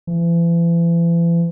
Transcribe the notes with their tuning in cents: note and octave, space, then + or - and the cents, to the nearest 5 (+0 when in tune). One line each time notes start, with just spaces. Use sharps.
E3 +40